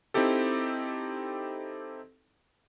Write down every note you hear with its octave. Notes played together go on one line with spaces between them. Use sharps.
C4 D#4 E4 G4 A4